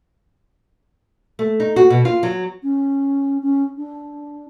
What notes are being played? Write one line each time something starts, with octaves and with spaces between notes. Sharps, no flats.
A3
D#4
F#4
B2
F4
F#3
C#4
C#4
D4